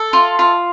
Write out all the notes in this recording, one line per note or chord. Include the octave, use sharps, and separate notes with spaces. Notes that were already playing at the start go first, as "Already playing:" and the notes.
Already playing: A4
F4
F4